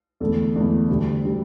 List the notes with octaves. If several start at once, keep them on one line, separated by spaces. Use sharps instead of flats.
E2 D3 A3 A4
E2 D3 A3
D2 D3 G3
D3 G3